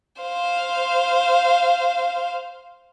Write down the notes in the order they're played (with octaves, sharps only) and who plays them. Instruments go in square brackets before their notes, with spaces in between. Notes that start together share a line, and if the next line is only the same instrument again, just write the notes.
[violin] C5 F5